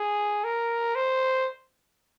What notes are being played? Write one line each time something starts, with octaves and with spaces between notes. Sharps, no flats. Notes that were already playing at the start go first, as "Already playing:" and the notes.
Already playing: G#4
A#4
C5